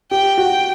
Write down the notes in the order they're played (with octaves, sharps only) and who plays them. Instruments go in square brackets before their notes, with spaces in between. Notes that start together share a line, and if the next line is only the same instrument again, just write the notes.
[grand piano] G4 [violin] G5
[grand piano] F#4